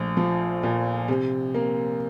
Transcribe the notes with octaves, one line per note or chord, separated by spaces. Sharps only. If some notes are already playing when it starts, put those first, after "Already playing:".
Already playing: A#1 A3
F3
A#2
C3
A#3